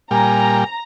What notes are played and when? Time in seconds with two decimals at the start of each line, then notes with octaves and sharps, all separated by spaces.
0.11 A#2 G3 G#5 A#5